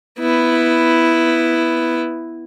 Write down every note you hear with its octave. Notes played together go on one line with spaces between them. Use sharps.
B3 E4